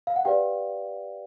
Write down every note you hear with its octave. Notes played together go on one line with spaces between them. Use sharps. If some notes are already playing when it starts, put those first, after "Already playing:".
F5
F#5
G4 B4 D5 F5 G5